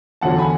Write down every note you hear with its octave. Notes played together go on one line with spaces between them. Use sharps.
E2 D3 F#3 F#5 A5
G#5 B5